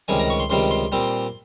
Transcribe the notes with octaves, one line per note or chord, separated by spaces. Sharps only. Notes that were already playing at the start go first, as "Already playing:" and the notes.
C#2 C3 D#3 G3 G#5
A#5
C#6
C6
C#2 C3 D#3 G3 C6
C6
A#2 G3 C4